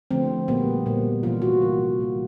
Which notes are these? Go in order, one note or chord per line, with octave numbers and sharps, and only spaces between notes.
D3 F3 A3 C4
A#2 G3 A#3 B3
A#2 G3 A#3
C3 E3 G3 A#3 F4
F#4
C3 E3 G3 A#3
A#2 G3 A#3